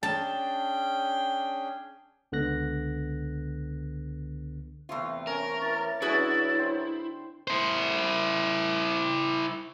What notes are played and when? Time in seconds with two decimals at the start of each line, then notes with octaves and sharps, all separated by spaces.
0.03 C#4 D4 G#4 G5 A5
2.32 C#2 D3 B3 F#6 A#6
4.89 E2 C3 A3 F4
5.27 C#4 A#4
5.62 E3 A6
6.02 D3 F#3 C#4 E4 F#4 G#4 B4
6.59 C5 G5
7.48 E4 C5